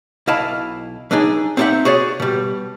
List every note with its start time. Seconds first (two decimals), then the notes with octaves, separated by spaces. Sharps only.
0.27 B1 E4 D#5 F5 A5 B5
1.11 F#3 D4 D#4 G#4
1.57 C4 D#4 G4 A4 E5 F#5
1.85 F#4 G#4 C#5 D5
2.20 B2 G3